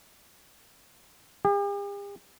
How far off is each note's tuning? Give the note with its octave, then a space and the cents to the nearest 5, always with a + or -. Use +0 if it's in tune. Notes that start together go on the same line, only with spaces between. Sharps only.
G4 +45